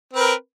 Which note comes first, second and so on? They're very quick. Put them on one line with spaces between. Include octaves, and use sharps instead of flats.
C4 B4 A#4